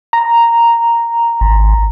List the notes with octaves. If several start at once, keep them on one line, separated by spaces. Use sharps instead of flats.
A#5
G#1